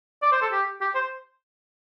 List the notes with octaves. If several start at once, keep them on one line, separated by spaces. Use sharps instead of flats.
D5
C5
A4
G4
G4
C5